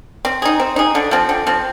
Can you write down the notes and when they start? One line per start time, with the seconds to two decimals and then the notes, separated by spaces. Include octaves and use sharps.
0.25 C4
0.42 D#4 G#4
0.59 C4
0.76 D#4 G#4
0.95 D3
1.11 F3 C4
1.29 D3
1.47 F3 C4